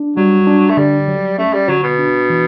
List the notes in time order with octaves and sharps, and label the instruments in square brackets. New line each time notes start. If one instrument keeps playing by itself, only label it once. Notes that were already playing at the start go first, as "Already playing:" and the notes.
Already playing: [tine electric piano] D4
[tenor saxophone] F#3 [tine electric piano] G3
[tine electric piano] D4
[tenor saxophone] A3
[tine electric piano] D3 [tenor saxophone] G3
[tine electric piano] F#3
[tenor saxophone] A3 [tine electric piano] C#4
[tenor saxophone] G3
[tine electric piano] D3 [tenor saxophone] F#3
[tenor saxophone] B2
[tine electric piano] D4
E3